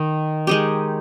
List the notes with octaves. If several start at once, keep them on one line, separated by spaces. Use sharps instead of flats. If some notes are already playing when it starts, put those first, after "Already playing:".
Already playing: D#3
G#3 D#4 G4